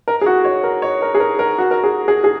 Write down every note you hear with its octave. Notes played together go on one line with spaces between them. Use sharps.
A#4
G#4
F#4
C#5
A#4
C#5
A#4
G#4
A#4
A#4
F#4
A#4
G#4
G#4
G#4